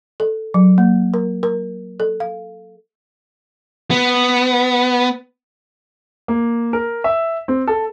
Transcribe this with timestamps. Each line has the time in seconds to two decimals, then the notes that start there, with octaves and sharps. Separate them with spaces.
0.20 A4
0.54 F#3
0.78 A#3
1.14 A#4
1.43 A#4
2.00 A4
2.20 F5
3.91 B3
6.28 A#3
6.73 A#4
7.04 E5
7.48 C4
7.67 A4